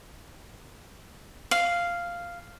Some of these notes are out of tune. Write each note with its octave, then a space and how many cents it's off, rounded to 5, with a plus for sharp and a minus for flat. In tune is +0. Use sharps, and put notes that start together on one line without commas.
F5 -5